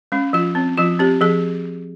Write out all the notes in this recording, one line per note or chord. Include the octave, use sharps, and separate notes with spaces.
G#3 C#4
F3 F4
C4
F3 F4
C4 G4
F3 G#4